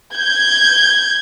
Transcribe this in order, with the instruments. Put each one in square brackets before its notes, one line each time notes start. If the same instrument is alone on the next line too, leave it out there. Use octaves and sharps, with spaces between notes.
[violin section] G6 G#6